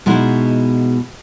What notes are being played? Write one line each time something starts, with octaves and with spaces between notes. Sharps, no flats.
B2 G#3 D#4 E4